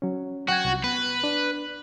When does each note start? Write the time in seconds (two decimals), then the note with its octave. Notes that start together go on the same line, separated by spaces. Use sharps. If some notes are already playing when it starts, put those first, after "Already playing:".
0.02 F#3 C#4
0.48 F#4 F#5 G5 G#6
0.65 C2
0.84 B3 B4
1.24 D4